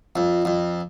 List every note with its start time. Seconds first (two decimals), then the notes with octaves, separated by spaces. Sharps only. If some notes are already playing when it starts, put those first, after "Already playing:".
0.16 F2
0.45 F2